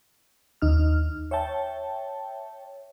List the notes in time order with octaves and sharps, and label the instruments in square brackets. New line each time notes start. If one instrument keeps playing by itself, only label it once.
[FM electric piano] D#2 D#4 F6
C#5 E5 G5 A5